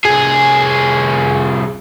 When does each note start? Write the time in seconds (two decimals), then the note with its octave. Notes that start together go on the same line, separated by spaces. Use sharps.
0.05 C2 G#4